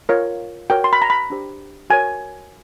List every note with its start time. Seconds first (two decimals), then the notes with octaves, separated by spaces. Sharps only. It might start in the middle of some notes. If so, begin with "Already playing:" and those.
0.09 F4 A#4 C#5
0.70 F#4 A#4 C#5 G5
0.84 C6
0.93 B5
1.02 A#5
1.10 B5
1.30 D4 G4 C5
1.90 F#4 A#4 C#5 G#5